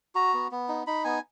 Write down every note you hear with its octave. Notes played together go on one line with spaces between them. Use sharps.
F#4 A#5
B3
B3
D#4
D#4 B5
B3 G#5